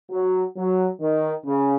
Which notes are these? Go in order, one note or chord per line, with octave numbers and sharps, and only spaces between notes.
F#3
F#3
D#3
C#3